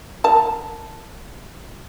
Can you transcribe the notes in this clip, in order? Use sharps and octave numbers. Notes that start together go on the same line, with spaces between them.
A#4 A5